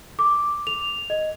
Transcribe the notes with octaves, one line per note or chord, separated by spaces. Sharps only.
D6
F7
D#5